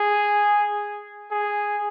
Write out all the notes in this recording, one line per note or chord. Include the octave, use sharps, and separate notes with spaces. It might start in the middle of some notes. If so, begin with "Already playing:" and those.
Already playing: G#4
G#4